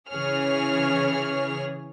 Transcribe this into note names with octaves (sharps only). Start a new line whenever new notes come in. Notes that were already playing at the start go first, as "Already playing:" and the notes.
C#3 E3 G#4 C#5 F6